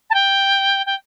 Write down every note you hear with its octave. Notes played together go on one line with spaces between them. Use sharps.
A5
G5
G5